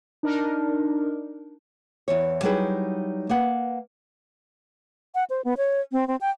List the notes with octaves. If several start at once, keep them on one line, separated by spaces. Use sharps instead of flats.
D4 D#4 A#4
E2 E3 C#5
F#3 G3 D#4 E4 G#4 B4
A#3 B4 F#5
F#5
C5
B3
C#5
C4
C4
G5